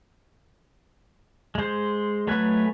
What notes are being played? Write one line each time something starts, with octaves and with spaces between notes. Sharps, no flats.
G#3 C5
F#3 A3 B4 G#5 F#6